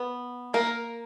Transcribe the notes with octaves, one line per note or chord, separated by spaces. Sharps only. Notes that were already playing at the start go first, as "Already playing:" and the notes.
Already playing: B3
A#3 A#4